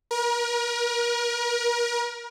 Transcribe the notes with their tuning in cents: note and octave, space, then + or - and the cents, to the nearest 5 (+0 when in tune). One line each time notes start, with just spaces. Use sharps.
A#4 +35